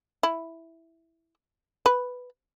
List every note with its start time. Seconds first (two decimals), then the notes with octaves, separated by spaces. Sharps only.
0.23 E4
1.86 B4